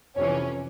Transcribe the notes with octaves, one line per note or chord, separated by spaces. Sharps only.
F2 C3 E3 C#4